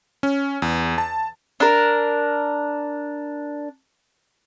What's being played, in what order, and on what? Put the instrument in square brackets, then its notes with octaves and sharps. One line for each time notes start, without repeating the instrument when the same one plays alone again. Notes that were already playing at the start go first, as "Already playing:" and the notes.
[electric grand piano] C#4
E2
A5
[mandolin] D4 A#4